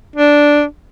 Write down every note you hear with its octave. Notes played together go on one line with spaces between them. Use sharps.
D4